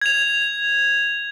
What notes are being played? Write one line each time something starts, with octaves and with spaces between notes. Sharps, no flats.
G#6 F7